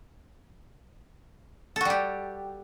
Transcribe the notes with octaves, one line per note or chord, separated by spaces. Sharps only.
G3 F#4 G4 A4